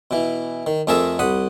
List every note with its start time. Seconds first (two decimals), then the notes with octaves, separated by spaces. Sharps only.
0.11 B2 E3
0.67 D#3
0.87 F2 A3 G#4 A#4 E5 A5
1.19 C2 F#5 B5 D#6